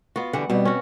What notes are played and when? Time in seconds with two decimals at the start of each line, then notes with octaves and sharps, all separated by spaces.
0.16 B3 F4 F#4
0.33 D3 E3 G3 F#5
0.50 B2 G3 B3 C4
0.65 C#4 F#4